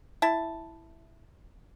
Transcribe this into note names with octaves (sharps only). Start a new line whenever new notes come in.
E4 A5